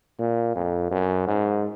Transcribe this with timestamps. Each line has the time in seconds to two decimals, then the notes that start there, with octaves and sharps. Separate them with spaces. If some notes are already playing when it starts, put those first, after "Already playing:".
0.19 A#2
0.55 F2
0.91 F#2
1.27 G#2